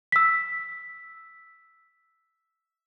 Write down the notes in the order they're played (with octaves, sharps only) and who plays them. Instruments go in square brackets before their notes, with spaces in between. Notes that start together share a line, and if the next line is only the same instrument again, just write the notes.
[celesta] E6 B6